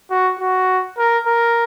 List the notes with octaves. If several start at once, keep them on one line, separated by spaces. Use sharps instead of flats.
F#4
F#4
A#4
A#4